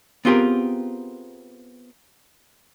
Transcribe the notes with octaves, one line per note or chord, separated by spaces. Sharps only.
B3 C4 F4 G4 G#4 A#4